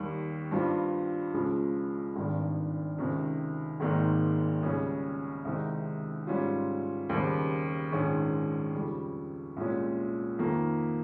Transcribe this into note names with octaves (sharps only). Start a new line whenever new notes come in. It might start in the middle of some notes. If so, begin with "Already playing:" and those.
Already playing: D#2 D#3 G3
G2 G3 C4 F4
C#2 C#3 F3 G#3
G#1 G2 D#3
C#2 C3 D#3
G#1 G#2 D#3 A#3 D#4
C#2 C#3 G3 C#4
C2 C3 D#3 G#3 D#4
G#2 G3 C#4 F4
D#2 C#3 G3 C4
A#1 G#2 D#3 G#3 C#4
F2 C#3 G3
C2 A#2 G#3 C#4
F2 D#3 A#3